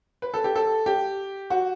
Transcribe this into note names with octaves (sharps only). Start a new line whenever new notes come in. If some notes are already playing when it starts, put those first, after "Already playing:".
B4
A4
G4
A4
G4
F#4